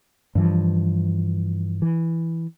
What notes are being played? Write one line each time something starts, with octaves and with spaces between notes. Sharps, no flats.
G2 E3 F3
E3